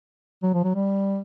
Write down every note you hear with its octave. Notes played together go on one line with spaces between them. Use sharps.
F#3
F3
F#3
G3